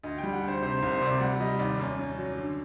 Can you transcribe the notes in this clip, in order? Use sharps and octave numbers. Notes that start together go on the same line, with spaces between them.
D2 D#5
G5
G3
F#5
D2
C5
C3 C5
C5
C2
C5
C3 D5
G3 F#5
G3 D#5
D#2 D5
F#2
F#2
F#3
D3